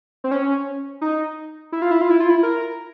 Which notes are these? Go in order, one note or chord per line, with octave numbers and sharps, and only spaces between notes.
C4
C#4
D#4
E4
F4
E4
F4
E4
F4
E4
A#4